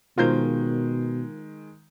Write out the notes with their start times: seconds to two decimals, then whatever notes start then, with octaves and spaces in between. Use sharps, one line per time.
0.18 B2 D#3 G#3 F4 A#4 C5 G6